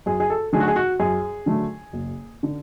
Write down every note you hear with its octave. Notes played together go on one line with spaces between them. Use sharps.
F#2 G#4
G#4
A4
D3 F#3 A3 G#4
F#4
G#4
F#4
F#2 G#4
D3 F#3 A3
F#1
D3